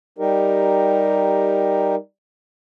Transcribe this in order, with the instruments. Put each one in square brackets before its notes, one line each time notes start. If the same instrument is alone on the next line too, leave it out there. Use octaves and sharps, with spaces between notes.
[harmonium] G3 D#4 G4 A#4